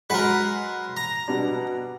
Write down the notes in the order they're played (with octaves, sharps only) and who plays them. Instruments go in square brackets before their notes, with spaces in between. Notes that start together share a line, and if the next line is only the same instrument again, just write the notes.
[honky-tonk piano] F#3 G#3 F#5 [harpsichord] A#4 B4
[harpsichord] A#5
[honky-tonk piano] B2 G3 D4